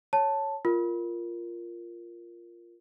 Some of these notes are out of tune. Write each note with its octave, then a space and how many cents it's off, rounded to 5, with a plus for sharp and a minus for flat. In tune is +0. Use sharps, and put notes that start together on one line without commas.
C#5 +0 A5 +0
F4 -10 A#4 +0